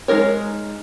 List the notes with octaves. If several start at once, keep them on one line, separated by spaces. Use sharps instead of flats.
G#3 A3 D#4 A#4 C#5